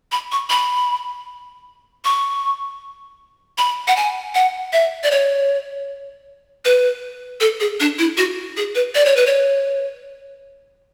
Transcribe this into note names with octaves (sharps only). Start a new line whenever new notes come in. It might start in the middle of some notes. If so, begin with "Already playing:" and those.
B5
C#6
B5
C#6
B5
F#5
G#5
F#5
E5
D5
C#5
B4
A4
G#4
D4
E4
F#4
G#4
B4
D5
C#5
B4
C#5